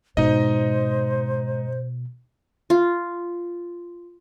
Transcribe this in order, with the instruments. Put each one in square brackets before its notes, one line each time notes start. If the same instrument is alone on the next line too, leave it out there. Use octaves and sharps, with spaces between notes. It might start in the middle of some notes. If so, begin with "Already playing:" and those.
[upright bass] G#2 [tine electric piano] B2 [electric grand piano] D#4 D#5 [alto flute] C5
[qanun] F4